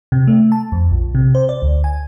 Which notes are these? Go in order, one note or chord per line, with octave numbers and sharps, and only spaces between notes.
C3
A3
A5
F2
A#1
C3
C5
D5
D2
G#5